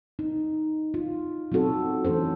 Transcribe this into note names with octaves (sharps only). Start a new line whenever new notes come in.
D#4
F4
F#3 C4 D#4 F#4 A4
E3 A3 C#4 A4 C5